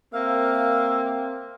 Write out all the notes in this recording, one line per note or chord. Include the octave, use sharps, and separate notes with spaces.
A#3 C4 A#4 E5 F5